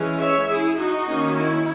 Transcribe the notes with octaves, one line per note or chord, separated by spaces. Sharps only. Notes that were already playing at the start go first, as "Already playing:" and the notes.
Already playing: E3 G#3 C#4
C#5 E5
E4 G#4
D#4 F#4
D#3 A#3 C#4
E4